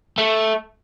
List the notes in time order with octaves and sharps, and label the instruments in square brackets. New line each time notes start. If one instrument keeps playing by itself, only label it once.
[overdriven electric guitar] A3